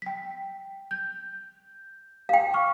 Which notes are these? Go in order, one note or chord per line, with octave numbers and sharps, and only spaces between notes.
G5 B6
G6
F5 G5
C#6 D6 F6